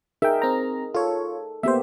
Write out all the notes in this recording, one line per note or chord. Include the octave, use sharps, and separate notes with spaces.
D#4 G#4 A#4 E5 G5
C4 A#5
F4 A4 C#5
A#3 B3 G4 C5 E5